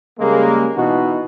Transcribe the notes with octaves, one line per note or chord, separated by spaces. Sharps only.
C#3 G3 G#3 A#3
B2 E3 B3 D#4 F#4